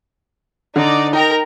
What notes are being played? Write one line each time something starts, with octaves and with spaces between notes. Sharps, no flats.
D3 D#4 D5
D#4 A#4 G5 A#5